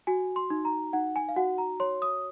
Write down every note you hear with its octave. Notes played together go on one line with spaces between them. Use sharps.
F#4 G#5
C6
D#4
A#5
D#4 F#5
G#5
F5
F#4 F#5
A#5
C#5 C6
D#6